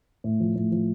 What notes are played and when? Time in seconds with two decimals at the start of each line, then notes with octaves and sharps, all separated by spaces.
0.24 A2
0.40 F3
0.56 A2
0.72 F3